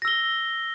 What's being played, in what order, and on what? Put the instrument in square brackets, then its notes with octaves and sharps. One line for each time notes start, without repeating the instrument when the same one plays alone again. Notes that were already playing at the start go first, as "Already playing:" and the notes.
[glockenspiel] A#6
E6
G7